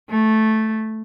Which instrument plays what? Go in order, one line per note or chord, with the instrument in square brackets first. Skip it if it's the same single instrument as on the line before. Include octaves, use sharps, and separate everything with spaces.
[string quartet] A3